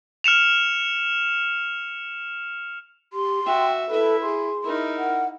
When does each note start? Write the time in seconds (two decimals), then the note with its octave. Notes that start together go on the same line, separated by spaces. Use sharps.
0.24 F6 C#7 E7 F7
3.13 G4 C6
3.46 F#4 E5 G5
3.89 E4 A4 B4 E5
4.22 G#4 C6
4.64 D#4 E4 A#4
4.98 F#5